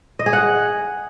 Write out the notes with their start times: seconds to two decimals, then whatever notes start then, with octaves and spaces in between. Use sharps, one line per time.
0.19 D#5
0.26 G#4
0.33 F#5